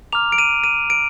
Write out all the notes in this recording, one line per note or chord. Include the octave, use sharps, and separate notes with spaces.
A#5 D6 F6 F7
D7
D#7
D#7
D7